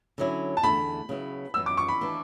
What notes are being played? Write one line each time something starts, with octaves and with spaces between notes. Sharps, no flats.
D3 F#3 C#4 E4
A5
E2 D3 A3 D4 B5
C#3 F#3 B3 E4
F#2 E3 B3 E6
D6
C#6
B5
E3 B3 D4